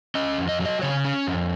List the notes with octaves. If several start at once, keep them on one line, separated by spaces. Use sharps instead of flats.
C#4 D#5
F2
D#5
F#3
D#5
C#3 C#5
C#4
F2